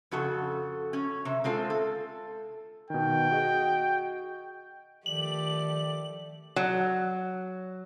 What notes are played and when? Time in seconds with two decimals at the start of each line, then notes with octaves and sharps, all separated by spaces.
0.11 F2 C#3 F#4 A4
0.93 C#4
1.25 C3
1.44 G#3 C4 F4 A4
1.70 A4
2.90 B2 D#3 G5
3.31 F#4 G#4 D#5
5.06 D#3 F3 A3 G4 D5 F#7
6.56 F#3